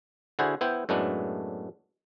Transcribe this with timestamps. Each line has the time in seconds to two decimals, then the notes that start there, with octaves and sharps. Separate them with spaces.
0.39 D3 E4 F#4 G#4 C5
0.61 B3 E4 C5 G5
0.89 F#2 A2 G#3 A3 B3 D4